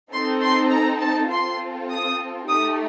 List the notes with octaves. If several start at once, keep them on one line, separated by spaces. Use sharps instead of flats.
C4 D#4 A4 C6
C6
A#5
A5
C4 F4 A4 C6
D#6
A3 D#4 G4 D#6